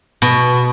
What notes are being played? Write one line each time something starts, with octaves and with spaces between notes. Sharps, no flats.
B2